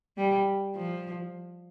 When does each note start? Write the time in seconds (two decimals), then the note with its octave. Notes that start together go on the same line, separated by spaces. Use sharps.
0.17 G3
0.76 F3